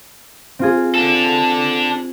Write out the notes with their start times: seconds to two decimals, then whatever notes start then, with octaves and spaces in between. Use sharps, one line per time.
0.59 C4 F4 G#4
0.95 D4 A4